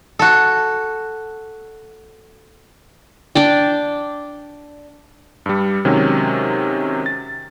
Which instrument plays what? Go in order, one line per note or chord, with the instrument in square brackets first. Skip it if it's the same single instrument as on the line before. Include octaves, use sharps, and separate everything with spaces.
[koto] F#4 A4
[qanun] D4 D5 G5
[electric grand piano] G2 G3
C3 D#3 F#3 G#3 C#4
A6